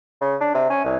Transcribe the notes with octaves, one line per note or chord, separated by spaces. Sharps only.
C#3
D4
C3
C#4
C2